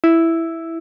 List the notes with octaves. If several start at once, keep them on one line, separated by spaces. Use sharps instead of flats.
E4